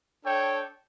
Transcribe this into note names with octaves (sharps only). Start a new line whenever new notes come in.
D4 A4 C#5 G5